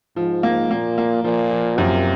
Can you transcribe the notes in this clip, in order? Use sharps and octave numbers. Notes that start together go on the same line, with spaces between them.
G#2 F3
A#3
A#2 A#3
A#3
A#2 F3
F3
F#2 C3